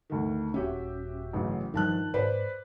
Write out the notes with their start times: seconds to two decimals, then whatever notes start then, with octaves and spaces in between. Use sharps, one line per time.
0.10 D2 D#3
0.54 D#1 C#4 F#4 G4 E5
1.33 A1 C#3 F#3
1.74 G2 D#3 F3 A5 F#6
2.14 G#2 B4 C5 D5